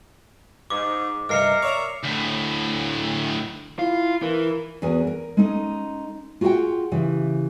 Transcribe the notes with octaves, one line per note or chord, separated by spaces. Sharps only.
G#2 D6
G2 C3 A#4 D#5 F6 C7 C#7
C#5 D5 E5 A#5
D2 A2
E4 F4
E3 A#4
E2 F#4 G#4 A#4 G#5
A#4
G#3 C#4 D#4 A4
F4 F#4 G#4 B4 F#5 G5
C#3 E3 G4